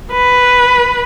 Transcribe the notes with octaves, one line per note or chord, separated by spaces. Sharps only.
B4